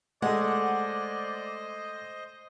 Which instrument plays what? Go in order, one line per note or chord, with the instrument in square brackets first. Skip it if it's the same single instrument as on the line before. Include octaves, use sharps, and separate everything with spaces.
[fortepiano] G#3 A3 [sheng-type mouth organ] C5 D#5 [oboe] D5 [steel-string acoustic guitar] F#5